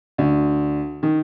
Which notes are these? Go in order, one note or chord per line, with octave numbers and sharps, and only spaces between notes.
D2
D#3